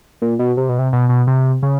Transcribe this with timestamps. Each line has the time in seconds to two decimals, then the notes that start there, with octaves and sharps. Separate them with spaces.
0.22 A#2
0.39 B2
0.57 C3
0.69 B2
0.79 C3
0.93 B2
1.09 B2
1.27 C3
1.63 C#3